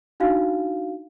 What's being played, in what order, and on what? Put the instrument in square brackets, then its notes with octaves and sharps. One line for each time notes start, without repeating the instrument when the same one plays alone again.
[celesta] D4 D#4 F#4 F5